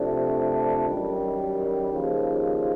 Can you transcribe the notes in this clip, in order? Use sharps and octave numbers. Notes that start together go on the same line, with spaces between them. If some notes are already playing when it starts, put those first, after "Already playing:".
Already playing: C3 F3 A3 D4
F#2 D#3 G3
D#2 C#3 F3